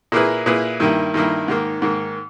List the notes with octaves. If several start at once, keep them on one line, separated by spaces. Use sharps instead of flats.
A#2 A#3 E4 G#4 B4
A#2 A#3 E4 G#4 B4
G2 D#3 A#3 E4
G2 D#3 A#3 E4
G#2 D#3 A#3
G#2 D#3 A#3